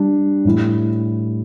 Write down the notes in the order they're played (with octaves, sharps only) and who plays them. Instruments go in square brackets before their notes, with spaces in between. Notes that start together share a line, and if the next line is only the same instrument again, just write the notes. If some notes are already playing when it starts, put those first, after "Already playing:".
Already playing: [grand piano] G3 D4
A2 G3 E4